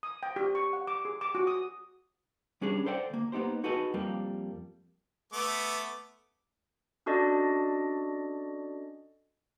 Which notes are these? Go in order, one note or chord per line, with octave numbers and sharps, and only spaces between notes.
D#6
G5
G4
C#6
F#5
D6
G#4
D6
F#4
D#6
G3 C#4 D4 G#4
A4 C5 D5 F#5 G5
D2 A#3
A#3 B3 D#4 G4 C5
D#4 F#4 G#4 A4 B4 D#5
F2 G3 A#3
A3 B3 D6
C#4 D4 F#4 A4 D5 D#5